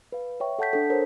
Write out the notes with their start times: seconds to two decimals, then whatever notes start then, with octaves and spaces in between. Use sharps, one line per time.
0.12 B4 F5
0.40 C#5 E5 G5 C#6
0.59 A4 F#5 A5 G6 B6
0.73 D4 A4
0.90 A#4 C5 C#5